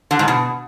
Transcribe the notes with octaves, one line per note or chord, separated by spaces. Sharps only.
D3
G#2
B2